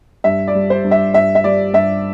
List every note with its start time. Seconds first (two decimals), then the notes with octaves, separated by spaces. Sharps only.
0.24 G2 E5
0.48 D5
0.55 G3
0.70 C5
0.84 G2
0.91 E5
1.14 G2 E5
1.35 E5
1.44 G3 D5
1.74 G2 E5